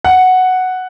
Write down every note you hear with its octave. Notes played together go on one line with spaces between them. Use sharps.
F#5